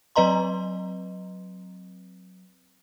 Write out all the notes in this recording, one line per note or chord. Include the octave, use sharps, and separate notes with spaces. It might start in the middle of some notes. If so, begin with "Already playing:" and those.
F#3 C4 B4 D#5 A#5 C6